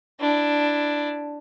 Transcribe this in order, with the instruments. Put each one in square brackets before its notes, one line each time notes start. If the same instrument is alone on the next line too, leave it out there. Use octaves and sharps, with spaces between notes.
[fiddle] D4 E4